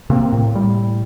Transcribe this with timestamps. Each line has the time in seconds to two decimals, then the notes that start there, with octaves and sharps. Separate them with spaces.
0.10 C3 A#3 C4
0.33 A2
0.54 A2 G3